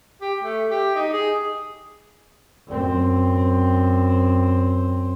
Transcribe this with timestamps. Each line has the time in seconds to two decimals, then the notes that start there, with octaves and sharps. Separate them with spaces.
0.21 G4
0.43 A3
0.70 G4
0.96 D#4
1.13 G#4
2.67 F#2 C4